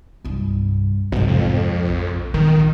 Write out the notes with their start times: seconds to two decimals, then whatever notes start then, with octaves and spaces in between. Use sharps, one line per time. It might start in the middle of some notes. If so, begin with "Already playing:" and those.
0.25 C2 G2
1.12 B1 G#2 C3
1.28 F2
1.88 A#1
2.34 A#2 D#3 B3